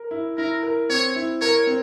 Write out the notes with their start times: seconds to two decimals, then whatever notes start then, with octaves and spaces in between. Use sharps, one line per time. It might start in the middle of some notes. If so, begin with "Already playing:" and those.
Already playing: A#4
0.11 E4
0.37 E4 A#4
0.63 A#4
0.89 C4 C#5
1.16 E4
1.41 A#4 C#5
1.67 C4